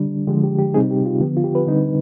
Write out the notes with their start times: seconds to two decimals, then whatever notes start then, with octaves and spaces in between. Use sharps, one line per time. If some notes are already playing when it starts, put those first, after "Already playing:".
Already playing: D3 G3 D4
0.28 D3 F3 G#3 G4
0.44 G4
0.58 G4
0.74 C3 G3 C4 D#4 G#4
0.91 G4
1.06 F4
1.20 D3 F3 B3 G4
1.37 F4
1.44 G4
1.55 B4
1.67 D3 G3 C4 D#4